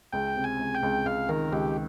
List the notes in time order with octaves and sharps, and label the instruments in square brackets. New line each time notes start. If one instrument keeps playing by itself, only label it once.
[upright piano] C#2 [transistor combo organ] G5
[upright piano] C3
[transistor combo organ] G#5
[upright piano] C#2
[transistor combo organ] G5
[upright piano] C#2
[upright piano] C#2 [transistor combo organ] F5
[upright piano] D#3 [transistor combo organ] A#4
[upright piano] C#2 [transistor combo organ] G4